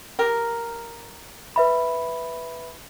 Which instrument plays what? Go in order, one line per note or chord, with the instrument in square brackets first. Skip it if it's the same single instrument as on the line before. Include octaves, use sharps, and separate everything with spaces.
[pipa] G4 A#4
[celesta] B4 E5 B5